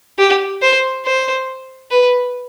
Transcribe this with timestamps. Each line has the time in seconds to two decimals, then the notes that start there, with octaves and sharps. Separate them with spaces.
0.18 G4
0.62 C5
1.05 C5
1.91 B4